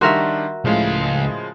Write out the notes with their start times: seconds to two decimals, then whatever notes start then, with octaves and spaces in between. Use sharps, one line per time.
0.01 D#3 G3 D4 F#4 A#4 E5 C6
0.65 C#2 A2 C#3 F3 G#3 F5